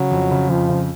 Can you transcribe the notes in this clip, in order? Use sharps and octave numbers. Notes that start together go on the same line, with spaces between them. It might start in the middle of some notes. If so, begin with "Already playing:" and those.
Already playing: C#3 F#3
F2
C#3
F2 F3
C#3